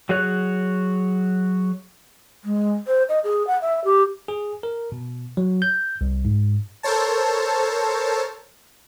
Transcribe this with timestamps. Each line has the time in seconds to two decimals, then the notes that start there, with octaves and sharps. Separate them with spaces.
0.09 F#3 F#4 G#4 C#5 F#6
2.44 G#3
2.87 C5
3.09 D#5
3.24 G#4
3.47 F#5
3.62 E5
3.84 G4
4.28 G#4
4.63 A#4
4.92 B2
5.37 F#3
5.62 G6
6.01 C2
6.25 G#2
6.83 A4 A#4 C5 C#5 A5